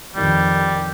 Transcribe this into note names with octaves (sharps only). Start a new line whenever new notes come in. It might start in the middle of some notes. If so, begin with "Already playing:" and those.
F2 D#3 G3